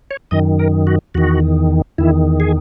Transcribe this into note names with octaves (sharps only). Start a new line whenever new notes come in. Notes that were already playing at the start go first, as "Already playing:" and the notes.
C#5
F#2 D#3 D#5
A#4
F#4
E2 D#3 F#4
E2 D#3 E4
G#4